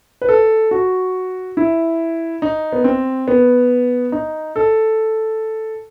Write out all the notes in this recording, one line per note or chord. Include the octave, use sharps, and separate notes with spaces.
B4
A4
F#4
E4
D#4
B3
C4
B3
D#4
A4